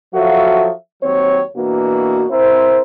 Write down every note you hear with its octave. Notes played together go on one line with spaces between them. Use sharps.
F3 F#3 F#4 A4 E5 F5
D#2 F#3 C4 C#5
B2 E3 A#3 D4 F#4
C4 E4 A#4 C5